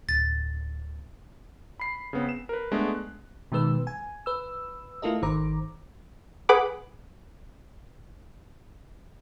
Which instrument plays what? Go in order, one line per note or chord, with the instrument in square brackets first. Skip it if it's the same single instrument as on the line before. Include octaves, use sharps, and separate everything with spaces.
[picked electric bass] D1 [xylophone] A6
[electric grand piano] B5 C7
C#3 B3 C4
E7
A#4 B4
G#3 A3 B3 D4
F#6
[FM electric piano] B2 D#3 G#3 B4 E6
G#5
B4 E6
A3 E4 F4 A4 A#4 D#5
G#1 D#3 C5 A#5 D6
[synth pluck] G#4 B4 F#5 B5 D6